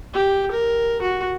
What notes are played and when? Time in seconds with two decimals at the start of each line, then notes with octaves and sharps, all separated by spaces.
0.14 G4
0.51 A#4
1.01 F#4